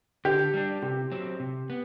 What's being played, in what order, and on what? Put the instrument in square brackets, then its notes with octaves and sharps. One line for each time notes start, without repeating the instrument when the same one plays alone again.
[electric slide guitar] D3 [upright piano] G4
[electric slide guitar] G3 D4
[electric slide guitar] C3 [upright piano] G4
[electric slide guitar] F#3 C4
C3
B3